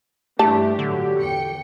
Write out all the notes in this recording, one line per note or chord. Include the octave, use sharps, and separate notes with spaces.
G2 E3 A3 D4 G4 A5
A2 D3 F#3
E2 G5 C#7